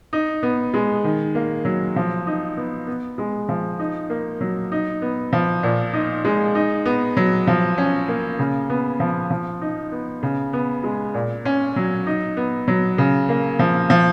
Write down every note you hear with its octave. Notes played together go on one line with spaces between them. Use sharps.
D#4
B3
G#3
D#3
A#3
F#3
F3
D#4
B3
B3
G#3
F3
D#4
A#3
F#3
D#4
B3
F3
A#2
D#4
G#3
D#4
B3
F#3
F3
C#4
A#3
C#3
B3
F3
F3
D#4
B3
C#3
B3
G#3
A#2
C#4
F#3
D#4
B3
F#3
C#3
A#3
F3
F3